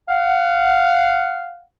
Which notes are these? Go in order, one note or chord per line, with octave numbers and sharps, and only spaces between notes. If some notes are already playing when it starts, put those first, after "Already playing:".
F5 F#5